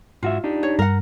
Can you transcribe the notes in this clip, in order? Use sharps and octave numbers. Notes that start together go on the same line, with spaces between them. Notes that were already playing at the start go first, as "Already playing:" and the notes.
G#2 F4 F#4 E5
D4 D#4 G4
C#5
G2 A#4 F#5